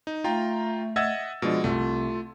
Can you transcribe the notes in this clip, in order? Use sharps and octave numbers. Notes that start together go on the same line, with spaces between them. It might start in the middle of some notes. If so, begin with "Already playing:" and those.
D#4
A3 F4 G5 A#5
D#5 E5 F#5 E6 G#6 A6
B2 F3 G#3 D4
C2 A3 F4